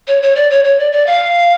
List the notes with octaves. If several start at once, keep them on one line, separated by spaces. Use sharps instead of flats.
C#5
C#5
D5
C#5
C#5
D5
D5
F5